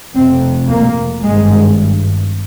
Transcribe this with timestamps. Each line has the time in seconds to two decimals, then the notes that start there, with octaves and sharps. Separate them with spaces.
0.15 F1 F2 C3 C4
0.69 A#3
1.23 G#1 G2 G#3